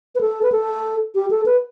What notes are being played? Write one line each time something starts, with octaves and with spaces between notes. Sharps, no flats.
B4
A4
B4
A4
G4
A4
B4